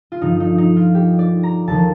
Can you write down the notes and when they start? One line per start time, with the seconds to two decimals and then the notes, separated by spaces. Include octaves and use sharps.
0.12 F4
0.21 G2 D3 F3 D#4
0.40 D#4
0.58 D#4
0.76 F4
0.95 G4
1.19 D5
1.43 A#5
1.67 D#2 D3 F3 A5